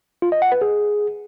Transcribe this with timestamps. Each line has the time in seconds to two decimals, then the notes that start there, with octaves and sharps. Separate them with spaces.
0.22 F4
0.32 D#5
0.42 F#5
0.52 B4
0.62 G#4